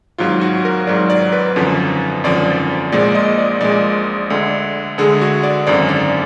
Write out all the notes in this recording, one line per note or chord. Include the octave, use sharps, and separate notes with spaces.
G#1 G#2 F#3 F4
F#4
A#4
G#1 G#2 F#3 D5
D5
B4
G#1 F#2 D3 F3
G#1 F#2 D3 F3 D5
A#1 A#2 G#3 D5
D#5
D5
A#1 A#2 G#3 D5
D2 D3 G#3
D2 D3 G#3 G#4
F#4
D5
G#1 F#2 D3 D5
D5